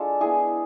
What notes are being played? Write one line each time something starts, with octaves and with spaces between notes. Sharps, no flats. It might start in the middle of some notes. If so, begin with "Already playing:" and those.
Already playing: G#3 D4 F4 A4
B3 E4 G#4